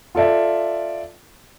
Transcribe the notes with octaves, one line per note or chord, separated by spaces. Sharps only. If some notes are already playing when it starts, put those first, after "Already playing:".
F4 A4 D5 E5